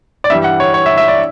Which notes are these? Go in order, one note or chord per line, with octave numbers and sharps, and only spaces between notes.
D5
G2 E3 G3 E5
F#5
C#5
C#5
E5
E5
D5